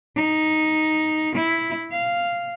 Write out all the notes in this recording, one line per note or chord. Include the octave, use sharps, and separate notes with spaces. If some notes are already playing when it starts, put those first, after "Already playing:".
D#4
E4
F5